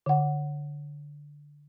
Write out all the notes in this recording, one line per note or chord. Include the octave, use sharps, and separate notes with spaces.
D3 F#5